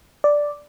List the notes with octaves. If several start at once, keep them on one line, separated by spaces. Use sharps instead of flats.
D5